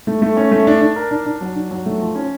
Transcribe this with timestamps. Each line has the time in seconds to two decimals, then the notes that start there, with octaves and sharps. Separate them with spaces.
0.07 A3
0.22 A3
0.37 C#4
0.52 A3
0.67 D4
0.81 D4
0.96 A#4
1.11 D4
1.26 D4
1.41 F#3
1.56 D4
1.71 F#3
1.86 A3
2.00 F3
2.15 C#4